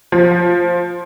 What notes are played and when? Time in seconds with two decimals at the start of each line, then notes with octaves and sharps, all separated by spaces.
0.12 F3